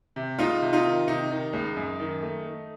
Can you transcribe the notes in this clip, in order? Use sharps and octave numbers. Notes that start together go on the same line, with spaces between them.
C3
C#2 D#4 F4
C3
D#4 F4
D#3
C3 D#4
D#3
C#2
F#2
D#3
A3
A3